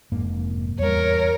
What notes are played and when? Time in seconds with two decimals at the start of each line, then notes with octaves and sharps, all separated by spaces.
0.12 F1 G#2 A#3
0.79 E2 G3 A#4 C#5